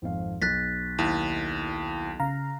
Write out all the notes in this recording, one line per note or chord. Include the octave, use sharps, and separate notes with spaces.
G#1 F2 F5
B1 F#6 A6 B6
D#2 E4
C#3 F5 A#5